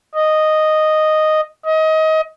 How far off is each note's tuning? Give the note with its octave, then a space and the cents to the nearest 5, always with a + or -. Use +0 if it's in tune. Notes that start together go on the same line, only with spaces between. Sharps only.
D#5 -5
D#5 +25